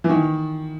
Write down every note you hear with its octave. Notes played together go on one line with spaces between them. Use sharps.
E3
D#3